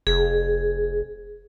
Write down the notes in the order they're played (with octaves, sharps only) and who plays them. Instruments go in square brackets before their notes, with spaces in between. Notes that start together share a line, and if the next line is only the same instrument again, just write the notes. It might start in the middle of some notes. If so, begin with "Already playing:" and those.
[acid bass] F1 [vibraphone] G#4